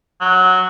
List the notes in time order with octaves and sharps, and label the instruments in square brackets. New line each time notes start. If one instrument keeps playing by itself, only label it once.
[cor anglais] F#3